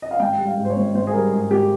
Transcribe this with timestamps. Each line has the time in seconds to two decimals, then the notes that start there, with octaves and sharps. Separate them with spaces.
0.02 D#5
0.11 F5
0.20 G#1 G5
0.38 G3
0.46 F5
0.57 G#2
0.65 C5
0.70 C#5
0.77 G#1
0.95 G#1 C5
1.07 G#4
1.13 G3 A#4
1.32 G#2 G#4
1.50 G#1 G4